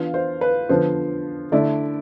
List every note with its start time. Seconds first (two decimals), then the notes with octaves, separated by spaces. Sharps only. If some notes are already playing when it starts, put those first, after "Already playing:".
Already playing: E3 B3 D4 F4 F5
0.14 C5
0.41 B4
0.69 D3 F3 B3 C5
1.52 D3 A3 E4 D5